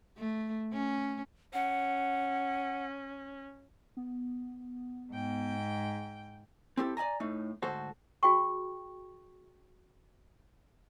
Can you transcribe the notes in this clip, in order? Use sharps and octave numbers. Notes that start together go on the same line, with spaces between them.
A3
C#4
C#4 F#5
B3
G#2 G5
C4 E4 G4 A4
D5 D#5 G#5 A#5
A2 A3 D#4
D2 G#2 F#4 A4 C5
F#4 G#4 G5 C#6